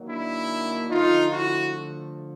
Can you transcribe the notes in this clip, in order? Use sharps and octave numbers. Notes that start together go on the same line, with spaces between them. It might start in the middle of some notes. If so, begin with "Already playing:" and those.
Already playing: D#3 F#3 A#3
D4 E4
D3 F3 A3 D#4 F4
E4 F#4